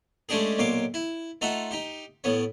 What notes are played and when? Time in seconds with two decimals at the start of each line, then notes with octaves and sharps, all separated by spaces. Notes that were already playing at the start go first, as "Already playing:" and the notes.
0.29 G#3 A3 C#4 D4 G4 G#4
0.58 B1 A#2 C#5 C6 D6
0.94 E4
1.41 A3 D#4 F4 E5 F#5
1.71 D#4 G4
2.24 A2 B3 C#5